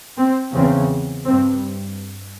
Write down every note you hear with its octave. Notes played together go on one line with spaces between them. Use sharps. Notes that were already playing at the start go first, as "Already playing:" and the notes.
C4
E2 C#3 C4
G2 C4